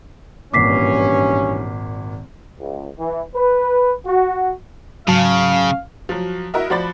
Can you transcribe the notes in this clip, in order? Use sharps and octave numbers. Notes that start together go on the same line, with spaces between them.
G#1 G2 A#2 E3 C#4 D6 B6 C7
C#2
E3
B4
F#4
G#2 C#3 F#3 F5 A5
F3 F#3
E4 F#4 A#4 D#5 E5
F3 F#4 C5 D5 B5 A6